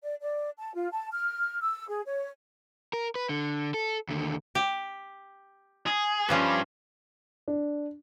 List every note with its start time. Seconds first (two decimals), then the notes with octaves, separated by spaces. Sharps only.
0.03 D5
0.21 D5
0.58 A5
0.74 F4
0.91 A5
1.13 F6
1.61 E6
1.89 G#4
2.06 C#5
2.93 A#4
3.15 B4
3.29 D3
3.74 A4
4.09 D#2 D3
4.55 G4
5.86 G#4
6.29 G2 F3 G3 C#4 B4
7.48 D4